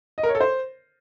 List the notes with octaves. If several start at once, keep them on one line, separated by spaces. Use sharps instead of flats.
D#5
A#4
C#5
A4
C5